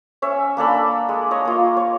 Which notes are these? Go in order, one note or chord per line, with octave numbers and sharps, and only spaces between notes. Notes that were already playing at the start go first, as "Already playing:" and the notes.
C#4 C#5 E5
A#3 D4 A4 B5
G#3
C#5 D#5
A#3 F4
C#5